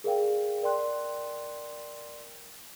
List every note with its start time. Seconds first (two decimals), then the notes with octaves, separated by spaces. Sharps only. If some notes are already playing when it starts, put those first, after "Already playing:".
0.04 G#4 A#4 D5 F5 G5
0.62 A#4 D5 G5 C6 F#6